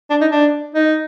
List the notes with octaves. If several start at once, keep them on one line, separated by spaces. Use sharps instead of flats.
D4
D#4
D4
D#4